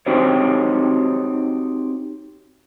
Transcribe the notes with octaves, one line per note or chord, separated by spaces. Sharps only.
C4 D#4 F#4 G4 C5 C#5